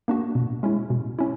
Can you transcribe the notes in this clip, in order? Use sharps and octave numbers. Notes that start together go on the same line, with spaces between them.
A#3 D4 F#4
B2
G#3 C#4 E4
B2
C#4 E4